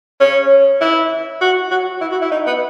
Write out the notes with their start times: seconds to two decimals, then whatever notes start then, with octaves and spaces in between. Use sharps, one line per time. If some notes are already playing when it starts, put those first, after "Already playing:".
0.20 C#4
0.80 E4
1.41 F#4
1.71 F#4
2.01 E4
2.11 F#4
2.22 E4
2.31 D#4
2.47 B3